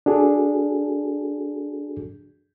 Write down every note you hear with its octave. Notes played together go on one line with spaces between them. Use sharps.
D4 F#4 G#4 A4